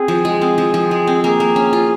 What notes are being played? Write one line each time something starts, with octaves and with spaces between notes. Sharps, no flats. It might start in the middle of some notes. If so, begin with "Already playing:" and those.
Already playing: C4 G#4
F3
G#3
C4
F3
F3
G#3
C4
A#3 G#4
A#3
C#4
F4